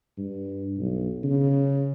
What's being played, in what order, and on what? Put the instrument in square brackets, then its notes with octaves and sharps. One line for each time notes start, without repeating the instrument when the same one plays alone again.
[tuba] G2
B1
C#3